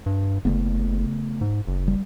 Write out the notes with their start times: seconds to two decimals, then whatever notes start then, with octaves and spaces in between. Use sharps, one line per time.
0.06 G2
0.45 F#1 C#3 A3 B3
1.41 G#2
1.67 F#1
1.88 G3